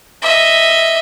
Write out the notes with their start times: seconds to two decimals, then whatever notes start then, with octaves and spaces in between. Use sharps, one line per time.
0.22 D#5 E5